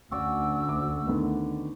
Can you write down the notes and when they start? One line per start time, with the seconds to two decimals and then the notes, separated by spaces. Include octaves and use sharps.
0.11 D2 C#4 F#4 D5 E6
0.69 D6
1.07 D3 D#3 B3